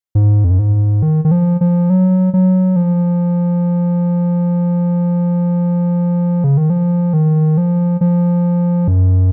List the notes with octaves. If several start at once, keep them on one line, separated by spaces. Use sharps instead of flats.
G#2
F2
F#2
G#2
D#3
D#3
F3
F3
F#3
F#3
F3
C#3
D#3
F3
D#3
F3
F3
F#2